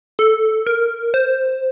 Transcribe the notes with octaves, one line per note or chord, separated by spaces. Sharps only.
A4
A#4
C5